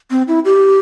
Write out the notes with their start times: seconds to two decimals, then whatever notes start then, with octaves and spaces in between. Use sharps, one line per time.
0.11 C4
0.28 E4
0.45 G4